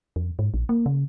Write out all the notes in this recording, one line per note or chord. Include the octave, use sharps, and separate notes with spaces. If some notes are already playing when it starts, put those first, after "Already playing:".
F2
G#2
A#1
A#3
C#3